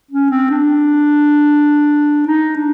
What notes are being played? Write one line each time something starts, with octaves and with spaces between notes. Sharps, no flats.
C#4
C4
D4
D#4
D4